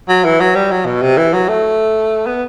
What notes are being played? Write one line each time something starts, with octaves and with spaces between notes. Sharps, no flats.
F#3
E3
F#3
G3
F#3
B2
C3
E3
F#3
A3
B3